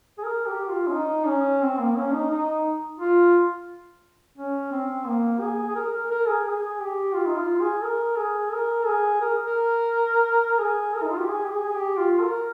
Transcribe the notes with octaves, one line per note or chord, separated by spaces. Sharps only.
G#4
A#4
G4
F4
C#4
D#4
C#4
C4
A#3
C#4
D#4
D#4
F4
C#4
C4
A#3
G#4
G#4
A#4
A#4
A#4
G#4
G#4
G4
F4
D#4
F4
G#4
A#4
G#4
A#4
G#4
A#4
A#4
G#4
A#4
D#4
F4
G4
G#4
G4
G#4
G#4
G4
F4
A#4